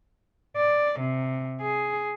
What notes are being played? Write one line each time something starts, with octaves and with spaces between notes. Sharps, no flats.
D5
C3
G#4